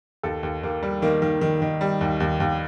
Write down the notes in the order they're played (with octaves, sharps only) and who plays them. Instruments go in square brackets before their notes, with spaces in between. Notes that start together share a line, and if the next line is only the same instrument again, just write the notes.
[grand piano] D#2 A4
D#2
D#2 A#3
G3
D#3 A#3
D#3
D#3
D#3
G3
D#2
D#2
D#2